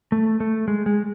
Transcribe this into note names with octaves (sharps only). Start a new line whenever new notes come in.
A3
A3
G#3
G#3